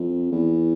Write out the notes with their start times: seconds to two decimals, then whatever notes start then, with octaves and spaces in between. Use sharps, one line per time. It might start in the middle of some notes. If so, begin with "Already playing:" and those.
Already playing: F2
0.31 E2